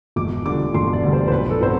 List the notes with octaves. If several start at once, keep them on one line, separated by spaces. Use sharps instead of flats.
E1 D6
D2 D3 G3 D6
E1 C6
D5
D2 D3 G3
C5
C5
B1 B4
A4
A2 F#3 C4 C5